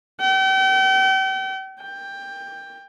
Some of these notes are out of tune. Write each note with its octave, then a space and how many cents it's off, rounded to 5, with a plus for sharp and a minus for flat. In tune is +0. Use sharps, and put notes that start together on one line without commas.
G5 -40
G5 +15